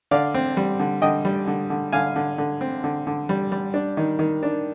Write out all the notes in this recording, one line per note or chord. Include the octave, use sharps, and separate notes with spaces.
D3 D5 F5
C4
G3
D3
D3 D#5 G5
G3
D3
D3
D3 F5 G#5
D3
D3
C4
D3
D3
G3
G3
D4
D#3
D#3
D4